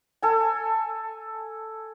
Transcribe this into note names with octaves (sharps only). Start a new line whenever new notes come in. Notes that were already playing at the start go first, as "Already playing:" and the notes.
A4 G#5